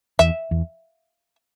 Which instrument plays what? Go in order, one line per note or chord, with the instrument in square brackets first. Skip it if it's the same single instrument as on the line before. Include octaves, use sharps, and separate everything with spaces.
[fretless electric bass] E2 [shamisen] E5
[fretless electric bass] E2